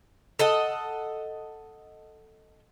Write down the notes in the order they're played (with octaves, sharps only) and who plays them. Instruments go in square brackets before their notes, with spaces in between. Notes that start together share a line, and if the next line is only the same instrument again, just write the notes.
[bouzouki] A4 D#5 F#5